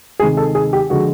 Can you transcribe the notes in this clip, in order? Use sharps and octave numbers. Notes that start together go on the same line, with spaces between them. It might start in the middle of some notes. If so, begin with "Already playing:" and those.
C3 D#3 G#3 G#4
A4
G#4
G4
D3 F3 G#3 F#4